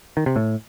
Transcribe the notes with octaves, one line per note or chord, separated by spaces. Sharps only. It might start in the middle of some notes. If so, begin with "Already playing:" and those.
D#3
C3
A2